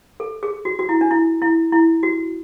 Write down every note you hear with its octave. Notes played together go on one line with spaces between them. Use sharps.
A4
G#4
F#4
F#4
E4
D4
E4
E4
E4
F#4